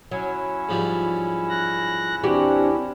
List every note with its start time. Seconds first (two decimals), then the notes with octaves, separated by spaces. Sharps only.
0.11 F#3 C#4 E4
0.69 G#2 F3 G3
1.49 F#6 A#6
2.23 E2 C4 D4 F#4 G4